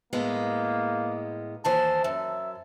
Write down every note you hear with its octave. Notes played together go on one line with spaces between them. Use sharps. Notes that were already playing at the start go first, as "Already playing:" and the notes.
A2 G#3 A#3 B3
D#2 E3 C5 A5
F#2 E5